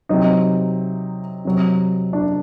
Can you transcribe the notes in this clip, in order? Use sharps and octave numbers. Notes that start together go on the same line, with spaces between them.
C3 F#3 D#4
C3 F#3
D4